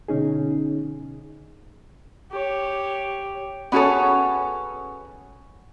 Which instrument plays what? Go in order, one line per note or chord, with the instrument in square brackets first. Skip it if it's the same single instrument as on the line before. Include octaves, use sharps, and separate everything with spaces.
[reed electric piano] B2 D3 C#4 D#4 G#4
[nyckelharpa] G4 C#5
[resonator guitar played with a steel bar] B3 C#4 F#4 G#4 A4 C#5